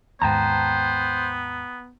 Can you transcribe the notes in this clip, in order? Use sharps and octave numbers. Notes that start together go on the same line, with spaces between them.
D#2 G#2 B3 C5 G5 A5 A#5